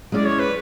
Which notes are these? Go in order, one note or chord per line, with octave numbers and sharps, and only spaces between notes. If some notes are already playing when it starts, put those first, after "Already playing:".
G#3 C#4 E4 G#4 D5
C#5
B4